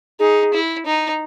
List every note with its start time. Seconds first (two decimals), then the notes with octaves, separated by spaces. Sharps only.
0.20 D#4 G#4
0.53 E4
0.86 D#4